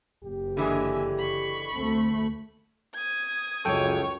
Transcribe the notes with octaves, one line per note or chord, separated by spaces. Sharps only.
F#1 G4
D3 E3 G#3 E5 G#5
B5 C#6
D2 A3 C4
D#6 G#6
C#2 F#2 A4 C#5 G5